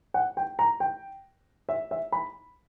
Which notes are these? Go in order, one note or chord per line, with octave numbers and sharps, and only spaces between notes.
F#5
G5
A#5
G5
E5
E5
B5